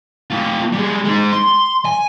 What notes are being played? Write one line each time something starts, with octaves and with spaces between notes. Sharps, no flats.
A3 F4
G3 G#3
G#3 D#4
C6
G#5